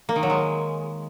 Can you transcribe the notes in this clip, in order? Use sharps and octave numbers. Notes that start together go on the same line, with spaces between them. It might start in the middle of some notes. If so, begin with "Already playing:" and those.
A#3
D#3
F#3
G#3